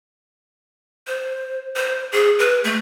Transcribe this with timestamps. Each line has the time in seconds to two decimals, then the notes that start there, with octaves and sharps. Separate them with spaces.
1.07 C5
1.76 C5
2.12 G#4
2.39 B4
2.64 A3